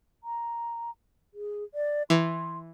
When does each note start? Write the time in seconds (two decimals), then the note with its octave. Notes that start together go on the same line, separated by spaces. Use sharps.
0.24 A#5
1.34 G#4
1.74 D5
2.10 E3 C6